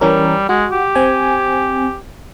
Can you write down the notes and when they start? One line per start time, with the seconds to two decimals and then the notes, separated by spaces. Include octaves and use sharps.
0.01 E3 G3 C#4 A#4
0.49 G#3 F#4
0.72 G4
0.95 C4 G#5